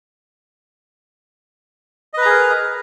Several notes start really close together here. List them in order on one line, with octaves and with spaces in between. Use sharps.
D#5 B4 A#5 G#4 A#4